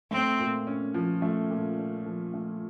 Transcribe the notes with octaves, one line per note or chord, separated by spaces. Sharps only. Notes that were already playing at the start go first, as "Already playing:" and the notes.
A3 C4
A#2
C#4
F3
A3
A#2
C#4
F3
A3